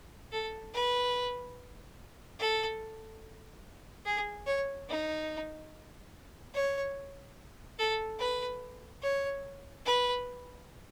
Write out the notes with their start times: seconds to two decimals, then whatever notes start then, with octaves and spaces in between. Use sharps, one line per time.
0.32 A4
0.74 B4
2.39 A4
4.05 G#4
4.46 C#5
4.88 D#4
6.54 C#5
7.79 A4
8.19 B4
9.02 C#5
9.86 B4